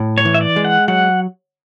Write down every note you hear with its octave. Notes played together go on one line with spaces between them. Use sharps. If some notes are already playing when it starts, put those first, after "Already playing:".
Already playing: A2
C#5
E3
E5
D5
G#3
F#5
F#3 F#5